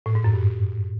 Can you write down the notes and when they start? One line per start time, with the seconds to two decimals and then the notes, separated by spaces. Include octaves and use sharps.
0.06 A2
0.15 G#2
0.24 F#2
0.34 G2